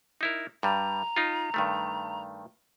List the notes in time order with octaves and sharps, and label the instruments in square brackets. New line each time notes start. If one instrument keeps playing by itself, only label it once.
[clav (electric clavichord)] D#4 E4 A#4
[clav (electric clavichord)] G2 G3 [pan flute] A#5
[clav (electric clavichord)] D#4 F4
G2 D#3 A3